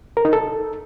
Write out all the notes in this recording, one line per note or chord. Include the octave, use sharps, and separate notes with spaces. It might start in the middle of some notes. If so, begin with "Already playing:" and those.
A#4
D#4
A4